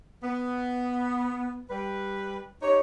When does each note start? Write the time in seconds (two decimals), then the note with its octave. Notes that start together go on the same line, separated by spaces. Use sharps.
0.24 B3
1.70 G3 B4
2.62 D#4 G4 C#5